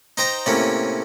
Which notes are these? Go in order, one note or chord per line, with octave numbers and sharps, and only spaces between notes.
D#4 C5 G5 A#5
A2 C3 A#3 C#4